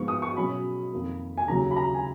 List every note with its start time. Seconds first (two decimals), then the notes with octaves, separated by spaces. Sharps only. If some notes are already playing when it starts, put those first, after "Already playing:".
Already playing: G#2 F3 B3 C#6
0.08 D#6
0.22 C#6
0.36 B2 F#3 C#4 B5
0.92 F2 D#3 A#3
1.37 G#5
1.48 D#2 C#3 F#3 A#5
1.71 B5
1.76 A#5
1.95 G#5